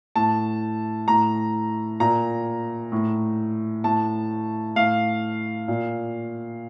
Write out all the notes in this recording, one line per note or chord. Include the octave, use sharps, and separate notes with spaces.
A2 A5
A2 A#5
A#2 A#5
A2
A2 A5
A2 F5
A#2